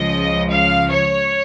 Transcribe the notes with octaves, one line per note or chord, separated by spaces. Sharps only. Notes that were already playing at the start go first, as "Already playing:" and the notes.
Already playing: C#2 C#3 F3 D#5
F5
C#5